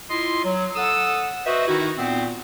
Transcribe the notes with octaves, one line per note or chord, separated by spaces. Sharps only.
E4 F4 D#5 C6
F#3
A4 F#5 D#6 E6
F#4 B4 C5 D#5 E5
D#3 D#4 E4 F#4
A#2 B3 C4